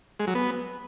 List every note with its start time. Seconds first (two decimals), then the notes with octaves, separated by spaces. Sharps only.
0.20 G#3
0.27 F#3
0.35 B3